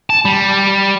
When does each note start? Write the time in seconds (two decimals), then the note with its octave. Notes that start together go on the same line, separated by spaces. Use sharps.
0.10 A5
0.25 G3